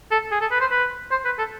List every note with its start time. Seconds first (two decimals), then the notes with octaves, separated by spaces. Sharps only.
0.11 A4
0.31 G#4
0.41 A4
0.51 B4
0.61 C5
0.71 B4
1.11 C5
1.25 B4
1.38 A4